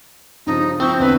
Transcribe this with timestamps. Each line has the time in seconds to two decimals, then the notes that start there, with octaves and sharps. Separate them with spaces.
0.47 G2 C#3 F3 D#4
0.80 F3 C4 E4 C#6 G6
1.00 E2 D3 B4